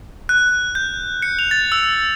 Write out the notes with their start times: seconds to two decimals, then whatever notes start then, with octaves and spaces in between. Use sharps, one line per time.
0.29 F#6
0.75 G6
1.22 C#7
1.39 F7
1.51 A6
1.72 E6